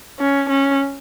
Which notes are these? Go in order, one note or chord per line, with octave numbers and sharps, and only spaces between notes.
C#4
C#4